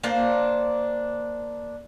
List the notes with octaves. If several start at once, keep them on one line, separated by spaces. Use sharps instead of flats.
A#3 D4 C5